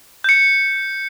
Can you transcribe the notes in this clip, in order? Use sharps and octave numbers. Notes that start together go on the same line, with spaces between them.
G6 C#7